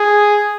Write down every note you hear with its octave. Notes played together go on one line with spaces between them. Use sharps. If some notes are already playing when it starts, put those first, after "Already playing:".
Already playing: G#4